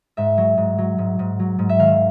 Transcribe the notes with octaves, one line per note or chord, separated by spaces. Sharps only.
G#2 E5
F#3
G#2
F#3
G#2
G#2
F#3
G#2
E5
D#3 F5